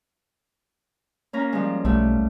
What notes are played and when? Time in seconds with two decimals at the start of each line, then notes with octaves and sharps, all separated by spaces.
1.33 A#3 C#4 A#5
1.52 F3 G3 G#3
1.85 B1 G3 A3